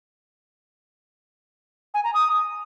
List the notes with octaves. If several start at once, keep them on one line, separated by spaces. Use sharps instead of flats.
G#5
A#5
D#6